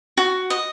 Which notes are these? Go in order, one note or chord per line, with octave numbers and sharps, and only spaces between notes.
F#4
D#5